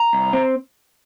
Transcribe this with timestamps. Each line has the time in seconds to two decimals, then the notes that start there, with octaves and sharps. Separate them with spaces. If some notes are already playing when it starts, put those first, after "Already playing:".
Already playing: A#5
0.13 C2
0.33 C4